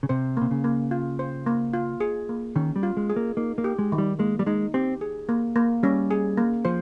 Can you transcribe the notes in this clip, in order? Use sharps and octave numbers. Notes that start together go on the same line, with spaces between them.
C#3
C3 C5
C3 A#3
C#3
A#3
F4
C5
A#3
F4
G#4
A#3
D#3 C#4
G3
F4
G#3
G#4
A#3
A#3 D#4
A#3
G4
G#3
D#3
G3
G#3 A#3
G3
G#3 D#4
C4 G4
G#4
A#3
A#3
G3 C#4
G#4
A#3
F3 C5